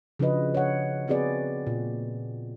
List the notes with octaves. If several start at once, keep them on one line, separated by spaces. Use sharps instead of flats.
C#3 F3 D4 F#4 B4 D#5
C#5 F#5
B3 C4 F#4 G#4 B4 D5
A#2